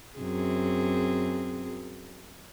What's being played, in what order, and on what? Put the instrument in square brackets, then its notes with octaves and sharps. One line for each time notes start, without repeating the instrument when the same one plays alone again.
[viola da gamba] F#2 C4 G#4